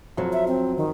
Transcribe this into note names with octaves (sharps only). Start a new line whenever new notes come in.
F2 F#3
E5
C4
D#3